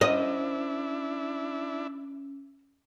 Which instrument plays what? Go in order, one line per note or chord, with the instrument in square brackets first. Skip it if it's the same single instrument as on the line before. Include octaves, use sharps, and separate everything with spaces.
[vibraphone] C#4 [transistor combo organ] D4 E4 [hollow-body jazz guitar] A#4 C5 F#5 [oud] D#5